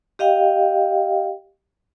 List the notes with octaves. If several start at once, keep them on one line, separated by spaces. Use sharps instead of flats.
G4 D#5 F5 G5